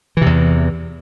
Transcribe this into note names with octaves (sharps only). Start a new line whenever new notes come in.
E2 C3 E3